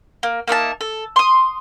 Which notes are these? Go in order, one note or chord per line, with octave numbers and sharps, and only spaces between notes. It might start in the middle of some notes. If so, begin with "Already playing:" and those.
A#3
A#3 D#4 E5 A5
A4
C6 D#6